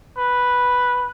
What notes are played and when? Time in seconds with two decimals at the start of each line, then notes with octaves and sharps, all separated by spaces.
0.18 B4